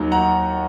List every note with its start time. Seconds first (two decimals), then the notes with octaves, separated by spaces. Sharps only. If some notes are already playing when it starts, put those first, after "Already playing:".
Already playing: D#2 D#3 F#3
0.12 F#5 A#5